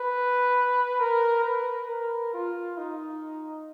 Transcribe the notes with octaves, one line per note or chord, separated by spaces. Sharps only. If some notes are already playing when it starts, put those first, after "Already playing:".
Already playing: B4
A#4
B4
A#4
F4
D#4